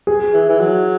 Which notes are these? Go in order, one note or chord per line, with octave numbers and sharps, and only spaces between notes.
G#4
E3
E3
F#3